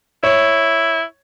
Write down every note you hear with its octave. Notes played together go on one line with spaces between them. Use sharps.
E4 C#5